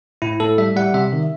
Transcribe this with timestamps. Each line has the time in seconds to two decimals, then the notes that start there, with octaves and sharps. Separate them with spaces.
0.22 A2 E4
0.40 A2 A4
0.58 G3 E5
0.76 G3 F#5
0.94 C3 E5
1.13 D#3